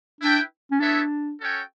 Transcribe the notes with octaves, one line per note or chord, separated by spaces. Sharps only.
D4 E4 B4 E5 G5
C#4
B3 D4 E4 A4 C#5 E5
C#4 F#4 A4 C#5 G5